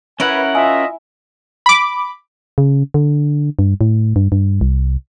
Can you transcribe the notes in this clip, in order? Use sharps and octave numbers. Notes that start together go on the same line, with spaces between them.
C#4 E4 A#4 B4 F#5 G#5
F4 D#5 E5 G#5
B5 D6
C#3
D3
G2
A2
G2
G2
C2